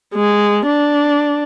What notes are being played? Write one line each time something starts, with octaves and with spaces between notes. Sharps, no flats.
G#3
D4